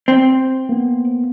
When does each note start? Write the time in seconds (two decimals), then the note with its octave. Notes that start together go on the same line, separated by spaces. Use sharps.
0.08 C4
0.69 A#3 B3